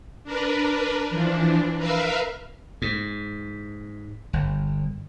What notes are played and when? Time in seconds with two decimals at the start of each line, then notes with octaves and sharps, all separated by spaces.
0.24 D4 A#4 B4
1.10 E3 F3 D4
1.77 A#4 B4 E5 F5
2.82 G#2
4.33 G1